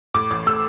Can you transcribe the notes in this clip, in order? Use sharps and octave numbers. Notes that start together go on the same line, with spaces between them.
A2 D6
A1 D6
A3 E6